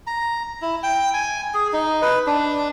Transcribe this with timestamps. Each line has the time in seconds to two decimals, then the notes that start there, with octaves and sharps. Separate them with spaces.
0.07 A#5
0.62 E4
0.83 G5
1.14 G#5
1.54 G#4
1.73 D#4
2.02 B4
2.26 D4